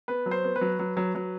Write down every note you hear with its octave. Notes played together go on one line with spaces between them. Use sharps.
B3 B4
F#3
C5
B3
B4
F#3
F#3
F#3
F#3